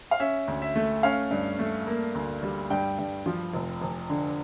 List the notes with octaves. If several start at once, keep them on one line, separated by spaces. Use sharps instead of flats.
F5
C#4 E5
D2
E5
A3
C#4 F5
G2
A3
A#3
D2
G3
G2 G5
G2
F3
F1
F1
D3